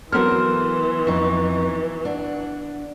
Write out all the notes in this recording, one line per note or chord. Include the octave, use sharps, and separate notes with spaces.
E3 F#3 B3 A4 A#4 C5 C6 F6
F2 D#4 C#6
D4 F#5